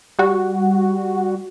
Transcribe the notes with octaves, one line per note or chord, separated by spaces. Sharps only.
G3 F#4